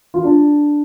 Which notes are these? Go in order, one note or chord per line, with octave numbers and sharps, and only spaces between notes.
F4
D4